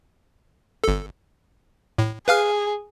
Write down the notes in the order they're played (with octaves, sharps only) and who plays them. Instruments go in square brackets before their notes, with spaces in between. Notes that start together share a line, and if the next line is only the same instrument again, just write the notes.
[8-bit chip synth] G1 A4
A2
[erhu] G#4 [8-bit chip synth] B4 F5 F6